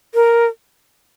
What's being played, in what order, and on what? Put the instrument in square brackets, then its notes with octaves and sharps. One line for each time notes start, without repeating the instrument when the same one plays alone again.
[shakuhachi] A#4